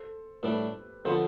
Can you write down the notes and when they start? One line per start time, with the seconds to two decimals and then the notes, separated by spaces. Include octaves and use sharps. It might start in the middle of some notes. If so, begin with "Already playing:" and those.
Already playing: A4 C5
0.43 A2 G3 D4 G4 B4
1.05 D3 F3 B3 A4 C5